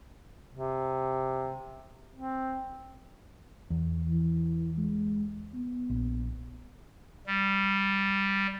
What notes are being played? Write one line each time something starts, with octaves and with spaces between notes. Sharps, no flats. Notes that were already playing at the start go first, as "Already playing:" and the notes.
C3
C4
E2
E3
G#3
B3
A#1
G3